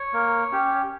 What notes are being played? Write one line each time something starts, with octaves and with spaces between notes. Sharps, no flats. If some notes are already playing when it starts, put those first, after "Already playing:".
Already playing: C#5
A#3
C#4 G4